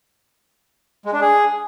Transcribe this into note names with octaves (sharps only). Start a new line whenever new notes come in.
G#3
D4
G#4